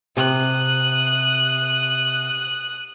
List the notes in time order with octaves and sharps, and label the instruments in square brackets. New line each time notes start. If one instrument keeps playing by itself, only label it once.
[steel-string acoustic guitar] C3 [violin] D#6 F#6